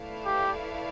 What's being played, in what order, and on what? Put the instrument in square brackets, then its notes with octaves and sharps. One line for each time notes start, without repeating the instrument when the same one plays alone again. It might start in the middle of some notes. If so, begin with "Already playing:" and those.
Already playing: [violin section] A3 E4 B4 D5 F5
[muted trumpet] G4